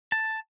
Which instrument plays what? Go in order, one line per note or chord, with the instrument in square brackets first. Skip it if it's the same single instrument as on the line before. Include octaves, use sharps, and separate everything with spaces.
[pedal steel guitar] A5